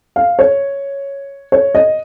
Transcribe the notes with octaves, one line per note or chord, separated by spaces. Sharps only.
F5
C#5
C#5
D#5